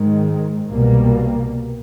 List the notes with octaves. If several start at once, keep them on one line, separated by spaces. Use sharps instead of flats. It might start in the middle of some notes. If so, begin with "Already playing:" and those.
Already playing: G#2 D#3 G#3
C2 B2 G3 A#3